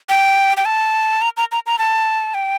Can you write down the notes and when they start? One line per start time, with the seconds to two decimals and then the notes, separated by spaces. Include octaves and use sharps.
0.09 G5
0.57 G5
0.65 A5
1.22 A#5
1.37 A#5
1.52 A#5
1.66 A#5
1.79 A5
2.34 G5